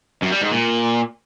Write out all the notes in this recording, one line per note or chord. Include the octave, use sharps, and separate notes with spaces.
F#2
G3
G#2
A#2